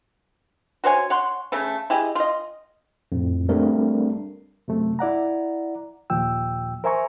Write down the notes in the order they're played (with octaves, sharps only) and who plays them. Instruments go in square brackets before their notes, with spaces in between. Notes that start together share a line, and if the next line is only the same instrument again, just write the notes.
[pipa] F#4 C5 C#5 G#5
C#5 F#5 C6
C#3 A3 A4
E4 G4 G#4 D#5
F4 D#5
[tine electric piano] F2 A2
G3 A3 C4 D4 A#4
[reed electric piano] F#2 C3 A3
E4 D5 F#5 A#5
D#2 A#2 F3 G5 E6
A#4 C5 E5 G#5 A#5 C#6